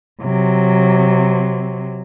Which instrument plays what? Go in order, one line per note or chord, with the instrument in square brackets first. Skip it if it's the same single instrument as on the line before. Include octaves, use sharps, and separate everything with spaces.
[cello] C3 F#3